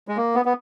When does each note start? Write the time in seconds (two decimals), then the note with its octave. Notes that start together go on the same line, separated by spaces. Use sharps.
0.08 G#3
0.17 A#3
0.35 B3
0.45 B3